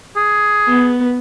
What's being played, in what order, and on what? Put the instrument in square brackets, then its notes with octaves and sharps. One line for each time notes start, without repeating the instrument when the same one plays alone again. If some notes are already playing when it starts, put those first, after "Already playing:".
[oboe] G#4
[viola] B3